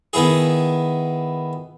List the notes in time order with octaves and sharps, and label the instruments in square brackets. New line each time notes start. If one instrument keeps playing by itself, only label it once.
[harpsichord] D#3 B3 E4 G#4